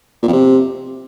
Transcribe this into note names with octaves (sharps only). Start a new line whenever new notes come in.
A#2
F2
C3